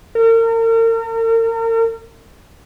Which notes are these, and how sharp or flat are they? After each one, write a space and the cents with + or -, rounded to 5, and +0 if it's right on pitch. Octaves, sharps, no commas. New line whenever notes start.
A#4 -40